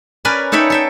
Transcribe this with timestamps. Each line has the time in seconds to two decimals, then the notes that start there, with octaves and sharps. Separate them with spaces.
0.25 C#4 A#4 B4 D5 G#5 B5
0.52 D#4 A4 C#5 E5 G5 B5
0.70 A4 E5 G5